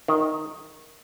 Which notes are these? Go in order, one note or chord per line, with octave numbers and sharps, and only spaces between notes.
D#3